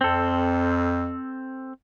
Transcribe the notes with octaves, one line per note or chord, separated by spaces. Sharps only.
F2 C4 A4